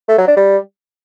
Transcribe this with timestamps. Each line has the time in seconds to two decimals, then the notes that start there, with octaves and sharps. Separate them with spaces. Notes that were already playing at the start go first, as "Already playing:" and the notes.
0.09 A3
0.18 F#3
0.27 D4
0.37 G3